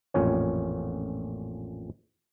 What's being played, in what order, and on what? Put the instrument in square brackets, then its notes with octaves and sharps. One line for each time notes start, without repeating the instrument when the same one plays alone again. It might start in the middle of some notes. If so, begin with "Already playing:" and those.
[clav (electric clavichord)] A1 F2 A#2 C#4 C#5